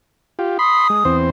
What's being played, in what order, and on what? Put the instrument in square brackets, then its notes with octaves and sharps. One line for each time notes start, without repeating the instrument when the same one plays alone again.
[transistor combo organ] F4 G4
[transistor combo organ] B5 C6 [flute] D#6
[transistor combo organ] G#3
E2 C4 C5